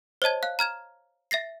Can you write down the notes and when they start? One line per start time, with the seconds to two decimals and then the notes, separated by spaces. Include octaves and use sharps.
0.22 C5 C#5 D#5 A5 G#6
0.43 F5 F#6
0.59 A#5 F6 G#6 E7
1.31 E5 A6 A#6 C7